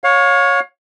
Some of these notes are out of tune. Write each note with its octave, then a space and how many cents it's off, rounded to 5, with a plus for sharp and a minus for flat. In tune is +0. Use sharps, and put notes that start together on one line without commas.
C#5 +0 F5 +35